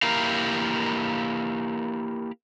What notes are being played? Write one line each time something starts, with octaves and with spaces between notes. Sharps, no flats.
A#3 E4 G4 A#4 F5